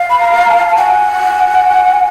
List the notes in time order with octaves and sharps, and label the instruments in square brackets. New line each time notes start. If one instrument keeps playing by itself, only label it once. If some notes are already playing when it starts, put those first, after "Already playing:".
Already playing: [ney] F5
[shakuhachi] B5
A#5
A5
A5
[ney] F#5 [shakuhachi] G#5